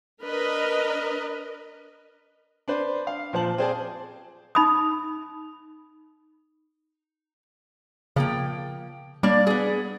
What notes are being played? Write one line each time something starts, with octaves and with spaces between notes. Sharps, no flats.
D4 A#4 B4 D#5
D4 B4 C5 D5
F5
A#2 F3 C5 A5 F#7
C4 G#4 C5 D5 G#5 A5
D#4 B5 D#6
C#3 F3 A#3 G5
G3 A#3 D4 D5
B3 G#4